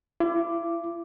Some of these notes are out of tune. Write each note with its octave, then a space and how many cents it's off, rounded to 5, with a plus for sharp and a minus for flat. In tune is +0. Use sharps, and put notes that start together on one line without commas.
E4 +45 D6 +0